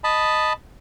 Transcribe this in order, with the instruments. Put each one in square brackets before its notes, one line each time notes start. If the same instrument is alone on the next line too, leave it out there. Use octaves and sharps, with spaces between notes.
[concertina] D#5 A5 B5